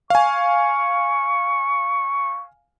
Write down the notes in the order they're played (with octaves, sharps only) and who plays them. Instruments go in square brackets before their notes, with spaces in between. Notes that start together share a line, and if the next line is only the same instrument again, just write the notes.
[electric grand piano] F5 G#5 [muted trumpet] C#6